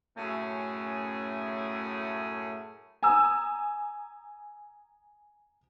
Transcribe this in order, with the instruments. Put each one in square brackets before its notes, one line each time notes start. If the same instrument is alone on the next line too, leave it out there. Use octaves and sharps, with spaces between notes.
[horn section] F#2 A2 A3 C#4 G#4
[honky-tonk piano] G#5 A#5 D#6 E6